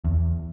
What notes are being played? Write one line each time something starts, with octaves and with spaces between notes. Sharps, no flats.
E2